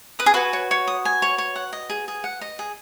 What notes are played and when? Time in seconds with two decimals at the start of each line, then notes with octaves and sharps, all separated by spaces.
0.19 B4 D#6
0.26 G#4
0.34 F#4 B4 G#5
0.53 C#5
0.71 C#5
0.87 D#6
1.05 G#5
1.22 C#5
1.38 C#5
1.56 F#5
1.73 D#5
1.90 G#4
2.08 G#4
2.24 F#5
2.41 D#5
2.59 G#4